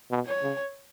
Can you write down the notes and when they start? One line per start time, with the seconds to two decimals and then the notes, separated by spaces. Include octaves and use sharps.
0.11 B2
0.26 C#5
0.42 C#3